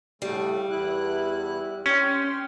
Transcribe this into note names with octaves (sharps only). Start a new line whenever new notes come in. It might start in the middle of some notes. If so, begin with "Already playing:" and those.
A2 C#3 G3 A3
E2 E4 F#6
C#4 G5 C6